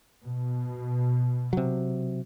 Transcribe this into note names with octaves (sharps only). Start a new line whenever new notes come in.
B2
C3 F#3